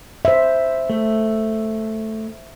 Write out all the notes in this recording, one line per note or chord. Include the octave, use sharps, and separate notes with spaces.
C5 E5
A3